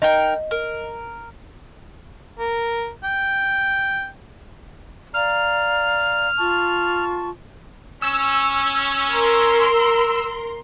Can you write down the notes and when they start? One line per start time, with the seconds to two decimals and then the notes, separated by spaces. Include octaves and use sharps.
0.02 D#4 A#4 D#5 G5
0.51 A#4
2.39 A#4
3.04 G5
5.14 D5 F5 A#5 F6
6.38 F4 A5 C#6
8.02 C#4 E6
9.12 A#4 C6